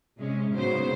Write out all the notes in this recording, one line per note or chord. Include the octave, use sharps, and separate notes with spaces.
C3 G#3 C#4
G#2 C#3 F#3 B3 C5